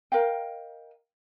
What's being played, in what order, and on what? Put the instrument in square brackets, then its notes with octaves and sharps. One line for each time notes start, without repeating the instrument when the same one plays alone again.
[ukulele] A#4 D#5 F5 G5